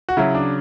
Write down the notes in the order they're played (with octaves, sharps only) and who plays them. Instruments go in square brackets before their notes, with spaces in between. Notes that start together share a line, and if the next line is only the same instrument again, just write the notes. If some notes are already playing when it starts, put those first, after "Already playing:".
[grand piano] F#4
C#3 F#3 E4
D4